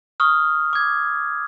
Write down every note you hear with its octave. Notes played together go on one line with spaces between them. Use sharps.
C#6 D#6 F6
D6 G#6